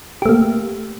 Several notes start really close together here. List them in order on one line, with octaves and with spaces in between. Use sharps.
G4 A3 A#3